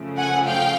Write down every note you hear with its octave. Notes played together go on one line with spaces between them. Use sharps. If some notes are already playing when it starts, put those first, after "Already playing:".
Already playing: F#2 C#3 F3 A3
F#5 G#5
F5 G5